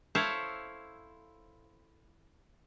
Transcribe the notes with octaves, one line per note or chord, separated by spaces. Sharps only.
E4 A4 C5 C#5 F5